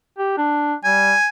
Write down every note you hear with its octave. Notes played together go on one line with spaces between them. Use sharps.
G4
D4
G3 G#5